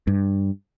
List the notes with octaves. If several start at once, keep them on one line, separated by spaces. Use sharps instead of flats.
G2